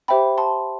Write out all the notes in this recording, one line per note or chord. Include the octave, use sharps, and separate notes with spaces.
G4 C5 E5 G5 B5
A5 C6